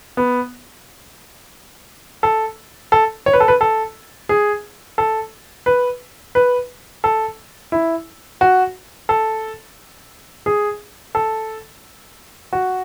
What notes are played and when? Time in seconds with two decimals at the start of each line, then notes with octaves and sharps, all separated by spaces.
0.17 B3
2.23 A4
2.92 A4
3.26 C#5
3.33 B4
3.40 A4
3.48 B4
3.61 A4
4.29 G#4
4.98 A4
5.66 B4
6.35 B4
7.04 A4
7.72 E4
8.41 F#4
9.09 A4
10.46 G#4
11.15 A4
12.53 F#4